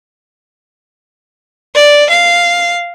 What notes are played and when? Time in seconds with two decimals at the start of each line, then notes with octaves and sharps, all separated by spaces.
1.75 D5
2.10 F5